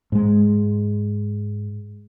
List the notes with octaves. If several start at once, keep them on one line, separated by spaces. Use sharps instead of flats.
G#2 G#3